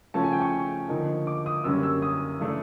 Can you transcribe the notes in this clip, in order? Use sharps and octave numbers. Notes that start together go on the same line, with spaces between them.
C#3 F3 A3 C#4 A5
G#5
G5
C#6
D3 F3 A#3 D#4
D6
D#6
F#2 D3 G3 A#3 C#4 E6
E6
D#6
C#3 E3 A3 D4